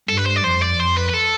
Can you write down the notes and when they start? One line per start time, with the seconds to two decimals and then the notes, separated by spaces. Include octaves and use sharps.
0.09 G2 A4
0.17 B4
0.26 C5
0.36 D5
0.44 F2 C5
0.62 D5
0.78 F2 C5
0.97 B4
1.09 B4
1.13 A4